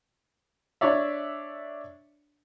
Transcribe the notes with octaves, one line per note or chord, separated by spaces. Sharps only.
D4 C#5 D5 E5